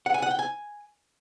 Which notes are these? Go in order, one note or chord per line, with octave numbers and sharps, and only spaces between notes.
F#5
G#5
F#5
G5
G#5